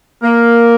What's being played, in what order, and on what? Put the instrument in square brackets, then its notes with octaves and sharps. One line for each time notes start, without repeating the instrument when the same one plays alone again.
[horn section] A#3